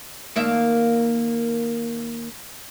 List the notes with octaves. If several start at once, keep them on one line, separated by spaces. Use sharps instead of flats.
D#2 A#3 E5